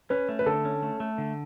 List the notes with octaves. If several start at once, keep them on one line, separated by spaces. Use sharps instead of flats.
C#4 B4
A3
B4
D3 A4
C#4
A3
A3
D3